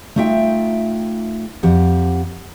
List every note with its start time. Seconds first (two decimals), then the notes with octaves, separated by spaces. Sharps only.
0.16 A3 D#4 F4 E5 G5
1.63 F2 G4 F#5